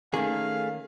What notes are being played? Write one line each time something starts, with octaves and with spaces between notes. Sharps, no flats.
D#3 A3 A#3 C#4 G#4 F5